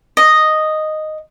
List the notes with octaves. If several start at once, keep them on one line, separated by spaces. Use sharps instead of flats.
D#5